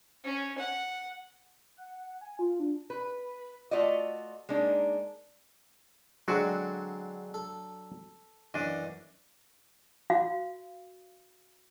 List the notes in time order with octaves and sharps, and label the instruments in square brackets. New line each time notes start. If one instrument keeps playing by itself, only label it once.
[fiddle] C#4
F#5
[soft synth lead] F#5
G#5
F4
D4
[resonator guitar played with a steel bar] B4
A3 F4 F#4 D5 D#5
G#3 A#3 D4 D#4
[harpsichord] D3 G#3 C4 [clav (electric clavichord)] F#3 D4 F#4
[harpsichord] A4
[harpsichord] F#2 E3 [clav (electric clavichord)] D4 D#5
[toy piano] F#4 F5